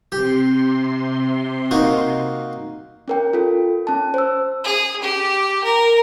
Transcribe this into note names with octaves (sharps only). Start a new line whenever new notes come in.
C3 G4 C6
A#3 D#4 F#4
C#4 A#4 G5
F4 A4
C#4 A5
C5 E6
G#4
G4
A#4